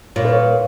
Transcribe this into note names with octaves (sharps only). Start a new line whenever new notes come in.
A#2 C#5
B4
C#5